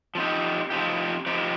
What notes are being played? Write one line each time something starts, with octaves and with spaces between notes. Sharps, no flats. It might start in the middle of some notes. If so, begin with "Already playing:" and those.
F3 C4 D#4 G4
F3 C4 D#4 G4
F3 C4 D#4 G4